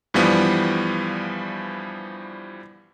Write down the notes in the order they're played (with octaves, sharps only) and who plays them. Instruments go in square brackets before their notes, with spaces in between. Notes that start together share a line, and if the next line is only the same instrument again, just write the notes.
[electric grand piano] G2 E3 F3 G3 B3